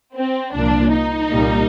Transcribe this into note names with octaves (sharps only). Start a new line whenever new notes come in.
C4
C2 A#2 F3 A#3 D4
D#4
C2 A#2 G3 A#3